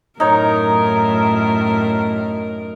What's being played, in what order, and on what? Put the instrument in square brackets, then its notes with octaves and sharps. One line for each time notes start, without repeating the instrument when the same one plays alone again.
[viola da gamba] F#2 A2 A#4 [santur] D#4 C#5